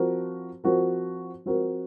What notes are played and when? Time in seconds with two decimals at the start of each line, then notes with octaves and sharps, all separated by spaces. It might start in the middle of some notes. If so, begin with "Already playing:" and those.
Already playing: F3 C4 F#4 A#4
0.64 F3 C4 F#4 A#4
1.46 F3 C4 F#4 A#4